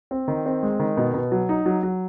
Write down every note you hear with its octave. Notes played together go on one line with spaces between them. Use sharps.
C4
D#3
C4
G#3
D#3
B2
B2
F#3
D#4
F#3
F#3